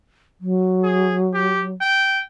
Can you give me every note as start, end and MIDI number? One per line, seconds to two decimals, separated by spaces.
0.41 1.74 54
0.83 1.15 68
1.34 1.63 67
1.81 2.21 79